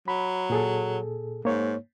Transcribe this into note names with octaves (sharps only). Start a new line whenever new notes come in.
F#3 B5
A#2 G#4 A4
G#2 A#3 C#5